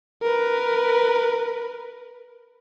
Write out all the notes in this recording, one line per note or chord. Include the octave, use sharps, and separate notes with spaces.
A#4 B4